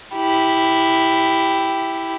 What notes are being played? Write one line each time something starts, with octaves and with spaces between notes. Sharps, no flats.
E4 G4